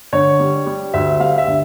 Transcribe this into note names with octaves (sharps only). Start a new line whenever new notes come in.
D3 C#5
G3
G3
D2 E5
G3 F5
E5
D3